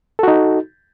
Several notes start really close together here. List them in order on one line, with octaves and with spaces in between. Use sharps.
A4 F#4 D#4